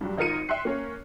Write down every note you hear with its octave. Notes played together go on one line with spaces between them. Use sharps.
G2 F#3 G3
G#1 D#4 F4 A#4 C#7 D#7
E5 G5 C6 F#6 C7
A#3 C#4 C#5